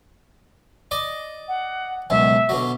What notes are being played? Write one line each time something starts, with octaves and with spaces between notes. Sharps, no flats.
D5 D#5 D6
F#5
C#2 F#2 B2 E5
B2 D3 F#3